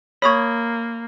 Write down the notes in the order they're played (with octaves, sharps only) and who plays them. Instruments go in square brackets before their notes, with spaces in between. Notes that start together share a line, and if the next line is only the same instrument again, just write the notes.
[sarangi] A#3 [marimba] C#5 C#6 [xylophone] B5 D#6 G#6